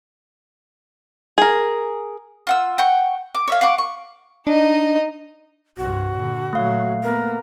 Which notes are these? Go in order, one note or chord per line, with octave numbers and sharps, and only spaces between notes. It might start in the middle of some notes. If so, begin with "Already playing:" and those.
G#4 A#4
F4 F#5 E6
F#5 G5 C#6
D6
C#5 E5 F5
F5 F#5 C#6 D6
C#6
D4 D#4 D#5
C2 G2 F#4
A#2 D3
A#2 F#3 A3 F5
A#3 B3 A#4